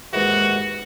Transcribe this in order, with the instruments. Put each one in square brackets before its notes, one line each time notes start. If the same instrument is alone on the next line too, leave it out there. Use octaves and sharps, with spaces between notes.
[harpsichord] D#2 G#2 E3 [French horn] F#4